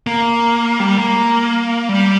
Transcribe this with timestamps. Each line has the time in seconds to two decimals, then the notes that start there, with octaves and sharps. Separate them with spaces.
0.07 A#3
0.80 G3
0.98 A#3
1.89 G3